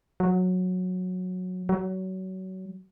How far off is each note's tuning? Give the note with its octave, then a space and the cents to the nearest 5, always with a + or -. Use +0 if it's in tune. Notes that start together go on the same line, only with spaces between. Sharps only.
F#3 -15
F#3 +25